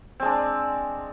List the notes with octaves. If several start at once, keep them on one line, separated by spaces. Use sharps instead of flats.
G#3 C4 D4